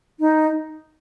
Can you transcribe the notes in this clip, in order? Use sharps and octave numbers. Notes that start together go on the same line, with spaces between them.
D#4